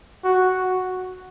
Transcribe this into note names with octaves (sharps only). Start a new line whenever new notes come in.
F#4